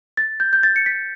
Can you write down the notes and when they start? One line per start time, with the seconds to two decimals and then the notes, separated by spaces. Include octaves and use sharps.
0.17 A6
0.40 G6
0.53 G6
0.63 A6
0.76 C#7
0.86 B6